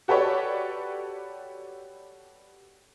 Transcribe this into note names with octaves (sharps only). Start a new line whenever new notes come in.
F#4 G4 A4 B4 C#5 D5